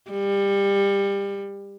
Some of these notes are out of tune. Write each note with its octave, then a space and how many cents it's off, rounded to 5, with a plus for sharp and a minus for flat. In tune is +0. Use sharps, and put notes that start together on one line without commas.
G3 +25